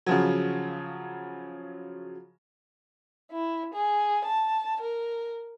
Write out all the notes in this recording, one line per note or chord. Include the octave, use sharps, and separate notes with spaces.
C#3 F3 F#3
E4
G#4
A5
A#4